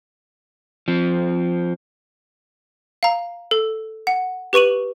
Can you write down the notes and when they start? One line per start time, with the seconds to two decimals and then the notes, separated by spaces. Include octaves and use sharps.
0.88 F3 C4
3.03 F5 A#5
3.51 A4
4.07 F#5
4.53 G4 B4 C#6 D#7 F#7